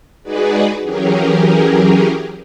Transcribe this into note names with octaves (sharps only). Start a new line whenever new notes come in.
G#3 D#4 F#4 G#4 B4 D5
E3 F#3 C#4 G4 G#4 A#4